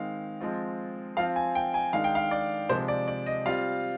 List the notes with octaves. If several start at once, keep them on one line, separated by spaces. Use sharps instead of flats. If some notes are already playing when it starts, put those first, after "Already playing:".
Already playing: D#3 G#3 C4 F5
F3 G#3 C4 F4
F3 C4 F4 F5
G#5
G5
G#5
D#3 G#3 D4 F5
G5
F5
D5
C3 F3 G#3 C5
D5
D5
D#5
G3 C4 F4 F5